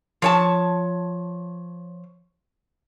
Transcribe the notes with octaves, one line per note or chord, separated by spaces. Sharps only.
F3 C#5 A5